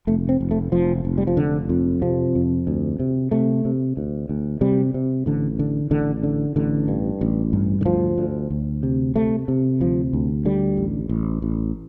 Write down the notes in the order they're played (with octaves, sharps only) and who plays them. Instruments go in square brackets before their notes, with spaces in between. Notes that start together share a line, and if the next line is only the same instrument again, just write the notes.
[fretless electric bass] F1 A3
C4
F1
A3
F1 F3
F1
G3
F3
F1 D3
F2
C3 F3
F2
D2
C3
C3 A3
C3
D2
D2
C3 G3
C3
A1 D3
D3
A1 D3
D3
A1 D3
G2
A1
G2
D3
D2 F3
D2
D2
C3
C3 A3
C3
D2 F3
D2
D3 G3
A1
A1
A1